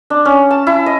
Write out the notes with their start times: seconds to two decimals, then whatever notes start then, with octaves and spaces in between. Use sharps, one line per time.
0.10 D4
0.25 C#4
0.51 A5
0.67 E4
0.86 D#5